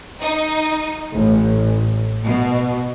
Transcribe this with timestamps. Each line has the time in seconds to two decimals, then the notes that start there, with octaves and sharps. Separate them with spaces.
0.21 D#4
1.14 A1
2.26 B2